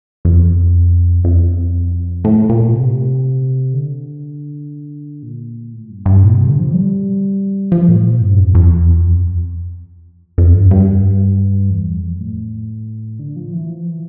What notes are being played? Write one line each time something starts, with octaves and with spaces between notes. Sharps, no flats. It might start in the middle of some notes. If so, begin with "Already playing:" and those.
F2
F2
A2
A#2
C3
D3
A#2
A2
G2
G2
A#2
C3
D3
F3
G3
F3
A2
A#2
G2
F2
F2
E2
F2
F2
G2
G2
E2
F2
A2
D3
F3
E3
F3
E3